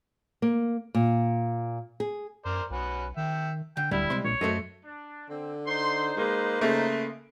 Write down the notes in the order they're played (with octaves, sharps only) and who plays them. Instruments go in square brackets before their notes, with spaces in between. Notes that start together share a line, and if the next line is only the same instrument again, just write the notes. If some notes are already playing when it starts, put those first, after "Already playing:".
[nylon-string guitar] A#3
A#2
G#4
[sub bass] F#2 [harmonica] A#4 C5 D5
[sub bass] B1 [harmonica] C#4 F#4 B4
[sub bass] D#3 [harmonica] E5 G5
[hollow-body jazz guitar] D3 [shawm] G5
[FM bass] D1 [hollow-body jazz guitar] D3 [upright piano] G3 [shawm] E4
[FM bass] C3 [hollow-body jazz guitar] G#3 C6
[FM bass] A#1 [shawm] C#5
[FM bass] F#2 [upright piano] A3 A4 [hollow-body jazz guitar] F#4 C5 D#5
[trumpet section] D4
[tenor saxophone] D3 [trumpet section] C4
[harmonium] D#4 C5 [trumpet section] C6
[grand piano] G#3 [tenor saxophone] A#3 [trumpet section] B4 D#5 C6
[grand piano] C#3 A#3 [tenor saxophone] A3